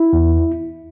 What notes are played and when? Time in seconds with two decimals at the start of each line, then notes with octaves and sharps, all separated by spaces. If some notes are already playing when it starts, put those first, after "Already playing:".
Already playing: E4
0.13 E2